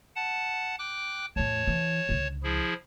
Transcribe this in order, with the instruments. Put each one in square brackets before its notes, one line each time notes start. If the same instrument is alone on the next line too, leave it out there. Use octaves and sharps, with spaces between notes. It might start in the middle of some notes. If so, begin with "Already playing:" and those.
[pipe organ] F#5 A5
G5 D6 F#6
[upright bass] E2 A2 [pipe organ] C#5 A5
[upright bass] E3
C#2 D3
[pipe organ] F3 E4 G#4